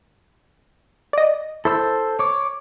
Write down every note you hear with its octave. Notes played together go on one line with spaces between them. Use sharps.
D5 D#5
E4 A4 C5 E6
C#5 D6